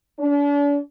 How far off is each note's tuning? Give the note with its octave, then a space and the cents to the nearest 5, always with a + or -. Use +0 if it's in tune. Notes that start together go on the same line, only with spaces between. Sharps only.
D4 -40